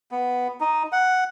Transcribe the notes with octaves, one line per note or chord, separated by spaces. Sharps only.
B3
D#4
F#5